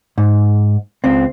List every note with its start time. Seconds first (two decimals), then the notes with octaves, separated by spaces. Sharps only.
0.18 G#2
1.04 C#2 C4